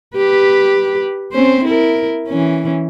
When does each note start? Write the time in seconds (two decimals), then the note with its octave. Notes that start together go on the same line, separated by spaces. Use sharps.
0.16 G4 B4
1.32 C4 C#4 C5
1.64 E4 A#4
2.28 E3 C#4